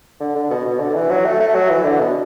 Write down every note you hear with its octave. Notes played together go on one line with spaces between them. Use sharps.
D3
D3
B2
B2
D3
D3
E3
F#3
A3
A3
F#3
E3
D3
B2